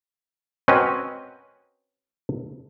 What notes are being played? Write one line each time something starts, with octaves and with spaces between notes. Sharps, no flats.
C4 C#4 F#4 A#4 B4 D#5